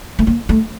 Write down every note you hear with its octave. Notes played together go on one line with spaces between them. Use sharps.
A3
A#3
A3